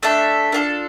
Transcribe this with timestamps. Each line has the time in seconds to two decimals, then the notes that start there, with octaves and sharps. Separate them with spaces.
0.03 A3 D4 A4 E5
0.52 D4 F4 A4